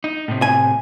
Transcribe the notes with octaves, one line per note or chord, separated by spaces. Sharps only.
D#4
A2 C3
G#5